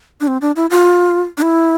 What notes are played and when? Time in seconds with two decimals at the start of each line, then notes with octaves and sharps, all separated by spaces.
0.20 D4
0.27 C4
0.41 D4
0.56 E4
0.70 F4
1.37 D4
1.42 E4